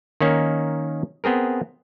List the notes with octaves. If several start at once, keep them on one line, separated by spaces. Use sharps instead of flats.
D#3 A#3 C#4 D#4
B3 C4 G#4 A#4